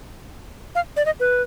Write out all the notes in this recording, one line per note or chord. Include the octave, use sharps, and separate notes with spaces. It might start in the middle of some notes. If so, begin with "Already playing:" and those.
F5
D5
D#5
B4